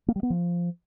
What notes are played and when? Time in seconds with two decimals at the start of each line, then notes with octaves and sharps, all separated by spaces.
0.08 A#3
0.16 G3
0.23 B3
0.30 F3